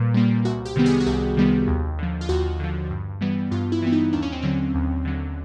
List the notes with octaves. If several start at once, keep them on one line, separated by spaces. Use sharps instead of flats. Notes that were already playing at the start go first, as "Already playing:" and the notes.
Already playing: A#2 G3 A#3 B4
G3 A#3
C2 F#4
G4
C3 D#3 G3 B3
G#4
F#4
C2 G4
C3 D#3 G3 B3
D#2
D3 F3
F4
D#2 F#4
D3 F3
G2
E3 G3 B3
G2 F4
E4
E3 G3 B3
D#4
D#2 D4
C#4
C4
D3 F#3 C#4
D#2
D3 F#3